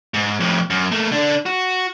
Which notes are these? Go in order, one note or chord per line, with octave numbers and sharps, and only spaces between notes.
G#2
F2 A2
F#2
A3 A#3
D3 D4
F#4